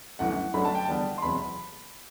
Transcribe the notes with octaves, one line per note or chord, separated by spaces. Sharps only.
G1 F#2 E3 A3 F#5
G1 F#2 D3 F#3 A3 B5
A5
G5
E2 D3 G3 B3 D4 A5
C6
E1 E2 C3 F#3 B5